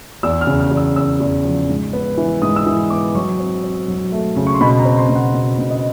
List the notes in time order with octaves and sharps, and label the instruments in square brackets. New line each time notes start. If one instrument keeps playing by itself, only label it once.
[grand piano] E2 E6
F6
C#3
F6
E2
E6
C#3 E6
E2
F3
G#2
B3
E3
G#2 D#6
E6
E3 D#6
B3 D6
F#3 C#6
C4
C4
F#3
A3
C#3
C#6
C6
B2 B5
A#5
C4
C6
B2
F#5
B2
B2
D#5